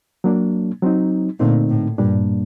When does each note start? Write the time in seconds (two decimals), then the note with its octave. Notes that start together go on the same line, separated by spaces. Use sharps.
0.24 F#3 A#3 D4
0.82 F#3 C4 D#4
1.39 A#2 D3 A3 C4 D#4
1.69 A2
1.98 G2 A#2 G3 A#3 D4